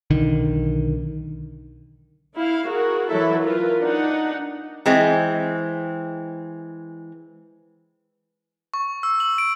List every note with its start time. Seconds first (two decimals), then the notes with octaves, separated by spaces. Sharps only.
0.10 B1 D3 D#3
2.38 E4 F5
2.68 F#4 G#4 A#4
3.10 E3 F#3 E4 A4 E5
3.44 F4 A#4 B4
3.82 D4 D#4 F#5
4.86 E3 G#3 C4
8.74 C#6
9.03 E6
9.20 F#7
9.38 D7